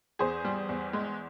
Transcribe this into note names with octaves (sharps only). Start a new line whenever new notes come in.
E2 G#4 C5
G3
E2
G#3